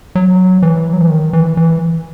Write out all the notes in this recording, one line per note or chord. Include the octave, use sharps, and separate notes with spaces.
F#3
E3
F#3
E3
D#3
E3
E3